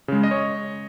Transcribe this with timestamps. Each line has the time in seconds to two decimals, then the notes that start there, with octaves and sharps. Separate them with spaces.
0.08 C#3 G#3
0.23 D#5
0.31 C#5